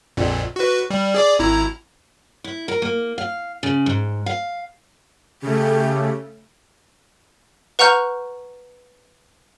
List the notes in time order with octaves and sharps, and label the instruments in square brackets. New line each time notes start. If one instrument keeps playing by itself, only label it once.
[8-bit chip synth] A#1 F2 A#2
F#4 B4
G3
G#4 D5 D6
G#1 E4 A#5
[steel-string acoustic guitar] E4
A#4
A#3
F5
C#3
G#2
F5
[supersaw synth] C#3 A3 [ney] G4
[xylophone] B4 F#5 A#5 C#6 F6 G6